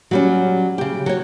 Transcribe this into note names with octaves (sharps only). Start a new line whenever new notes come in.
F#3 G3 C#4
C#3 G4
F#3 C#5